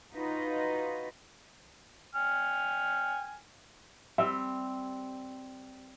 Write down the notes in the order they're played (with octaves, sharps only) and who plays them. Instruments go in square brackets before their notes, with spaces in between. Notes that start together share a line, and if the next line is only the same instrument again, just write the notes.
[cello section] D#4 F4 F#4 B4 D#5
[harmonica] G5 G#5 F6
[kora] G3 C4 [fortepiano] E5